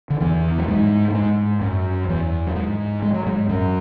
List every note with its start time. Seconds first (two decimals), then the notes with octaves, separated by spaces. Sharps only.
0.10 D3
0.20 E2 E3
0.58 F#3
0.68 G#2 G#3
1.08 A3
1.14 G#2 G#3
1.61 F#2 F#3
2.09 E2 E3
2.47 F#3
2.56 G#2 G#3
3.02 G#3
3.14 F#3
3.26 G#2 G#3
3.49 F#2 F#3